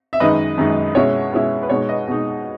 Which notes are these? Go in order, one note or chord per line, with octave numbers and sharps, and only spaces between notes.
E5
F#2 D#3 G#3 D#4 B4 D#5
F#2 D#3 G#3 D#4
B2 G#3 C#4 E4 C#5
B2 G#3 C#4 E4
B4
B2 G#3 D#4 C#5
B4 D#5
B2 G#3 D#4